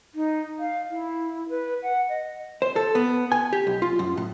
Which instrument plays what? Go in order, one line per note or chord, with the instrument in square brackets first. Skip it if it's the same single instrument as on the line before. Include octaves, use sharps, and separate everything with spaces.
[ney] D#4
F5
E4
B4
F#5
D#5
[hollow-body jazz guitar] C5
A4
B3
G#5
G4
B1
F4
F#2
A2